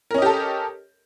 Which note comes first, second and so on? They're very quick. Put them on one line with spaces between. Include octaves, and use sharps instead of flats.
A#4 C#4 D#5 G4 A4